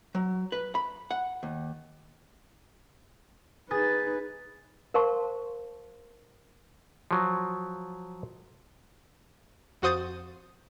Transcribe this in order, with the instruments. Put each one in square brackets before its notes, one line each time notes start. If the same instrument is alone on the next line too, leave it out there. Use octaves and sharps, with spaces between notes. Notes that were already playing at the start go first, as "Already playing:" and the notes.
[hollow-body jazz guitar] F#3
B4
B5
F#5
D#2
[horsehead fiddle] D#4 B4 [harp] G#4 A6
[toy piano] A#4 C5 F5 A5 C6 C#6
[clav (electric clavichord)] F3 F#3
[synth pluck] F2 F#4 C5 D#6 G6 A6